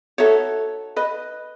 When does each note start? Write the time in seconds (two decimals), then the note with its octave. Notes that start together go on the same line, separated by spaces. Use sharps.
0.18 D#4 F#4 A4 C#5 E5
0.96 B4 D#5